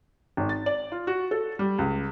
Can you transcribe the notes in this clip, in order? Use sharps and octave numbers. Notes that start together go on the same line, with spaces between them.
G#1
A6
D5
F4
F#4
A4
G3
C#2